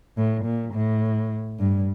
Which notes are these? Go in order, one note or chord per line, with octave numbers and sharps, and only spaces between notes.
A2
A#2
A2
G2